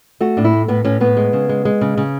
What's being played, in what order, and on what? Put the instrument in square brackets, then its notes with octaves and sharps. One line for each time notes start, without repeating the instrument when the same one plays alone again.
[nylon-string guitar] A3 F#4
A2 D4
E4
A3
A2 B3
A2 C#4
A2 B3
G#3
C#3
G#3
G#3
C#3
C#3